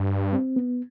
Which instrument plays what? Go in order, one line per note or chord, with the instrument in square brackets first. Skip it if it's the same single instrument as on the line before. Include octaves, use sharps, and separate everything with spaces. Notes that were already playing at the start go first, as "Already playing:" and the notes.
Already playing: [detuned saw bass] G2 [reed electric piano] D4
[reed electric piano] C4
B3